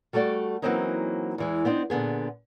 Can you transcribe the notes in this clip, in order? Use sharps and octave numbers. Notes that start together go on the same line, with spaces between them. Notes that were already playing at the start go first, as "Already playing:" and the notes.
G3 A3 F#4 A4 D5
E3 F#3 A#3 C4 C#4 D#4
E2 E3 G#3
B3 C4 D4 D#4
A#2 D3 B3 G#4